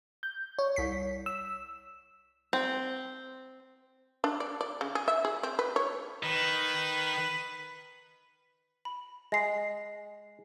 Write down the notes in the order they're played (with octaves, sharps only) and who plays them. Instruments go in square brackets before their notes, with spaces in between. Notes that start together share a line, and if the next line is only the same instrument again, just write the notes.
[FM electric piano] G6
C#5
[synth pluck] C2 B6
[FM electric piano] E6
[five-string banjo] C4
[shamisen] D4
D5
D5
C#3
G#4
E5
G#4
C4
B4
C#5
[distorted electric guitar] D#3 [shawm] B4
[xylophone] B5
[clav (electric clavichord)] G#3 [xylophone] A#6 C7